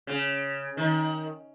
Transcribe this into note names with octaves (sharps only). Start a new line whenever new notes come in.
C#3
D#3